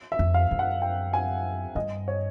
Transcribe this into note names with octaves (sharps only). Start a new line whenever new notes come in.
E5
F2
F5
F#2
F#5
G5
G#5
G2 D#5
C#5